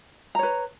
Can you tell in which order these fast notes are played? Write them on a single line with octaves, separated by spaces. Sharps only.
A#5 C#5 B4